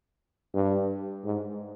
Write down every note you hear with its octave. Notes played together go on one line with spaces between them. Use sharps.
G2
G#2